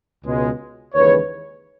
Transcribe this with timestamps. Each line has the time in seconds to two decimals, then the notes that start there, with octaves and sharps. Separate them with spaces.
0.25 C#2 B2 G#3
0.95 D#2 C#3 E3 G#3 B4 C#5